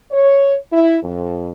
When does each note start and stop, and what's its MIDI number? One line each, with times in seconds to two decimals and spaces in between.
0.10 0.55 73
0.71 0.97 64
1.02 1.52 41